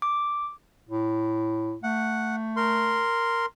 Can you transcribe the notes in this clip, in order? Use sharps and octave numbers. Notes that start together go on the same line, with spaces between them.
D6
A2
A3 F#5
A#4 C6